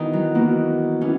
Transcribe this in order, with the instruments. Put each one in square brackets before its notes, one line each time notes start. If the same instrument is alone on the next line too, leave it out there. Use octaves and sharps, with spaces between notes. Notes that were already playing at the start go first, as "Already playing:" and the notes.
Already playing: [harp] D#3 [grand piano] E3 B3 D#4 F#4
[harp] F#3
[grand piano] E3 B3 D#4 F#4 [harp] A#3
[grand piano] E3 B3 [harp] C#4